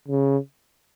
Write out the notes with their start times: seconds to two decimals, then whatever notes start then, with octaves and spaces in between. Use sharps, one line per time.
0.08 C#3